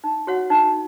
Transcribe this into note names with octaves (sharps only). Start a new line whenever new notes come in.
D#4
F#4 C#5 F#5
D#4